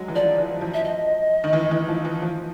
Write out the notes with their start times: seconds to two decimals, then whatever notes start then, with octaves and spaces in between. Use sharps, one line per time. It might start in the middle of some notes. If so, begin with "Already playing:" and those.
Already playing: F#3 G#3
0.08 E3
0.15 F3 D5
0.38 E3
0.61 F3
0.74 E5
0.84 D#5
1.44 D#3
1.53 E3
1.71 E3
1.88 F3
2.05 E3
2.22 F3